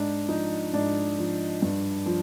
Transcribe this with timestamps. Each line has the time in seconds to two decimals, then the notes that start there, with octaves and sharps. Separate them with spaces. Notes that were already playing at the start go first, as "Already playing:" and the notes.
Already playing: G#2 D4
0.28 F3 D#4
0.73 G#2 D4
1.18 F3
1.62 G2
2.06 F3